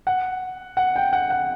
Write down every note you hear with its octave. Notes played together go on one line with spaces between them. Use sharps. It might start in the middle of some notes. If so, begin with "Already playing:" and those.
F#5
F#5
G5
F#5
F#5